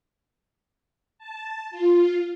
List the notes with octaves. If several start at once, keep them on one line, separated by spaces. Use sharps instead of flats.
A5
F4